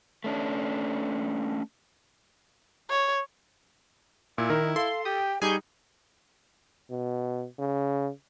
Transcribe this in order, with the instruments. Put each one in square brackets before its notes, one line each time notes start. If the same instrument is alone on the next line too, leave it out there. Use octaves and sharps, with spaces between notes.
[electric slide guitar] A3 C#4 D4
[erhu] C#5
[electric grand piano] A#2 [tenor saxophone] E4
[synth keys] D#3 [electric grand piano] A#4
[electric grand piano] A4 [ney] F5 [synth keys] C6
[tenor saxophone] G4 [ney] G5 [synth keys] D#6
[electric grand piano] G3 D#4 [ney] G4 [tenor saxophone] G#4 [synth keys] G#5 C#6 G6
[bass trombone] B2
C#3